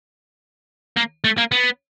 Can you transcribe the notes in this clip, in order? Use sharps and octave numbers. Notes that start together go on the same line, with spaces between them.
A#3
A3
A#3
B3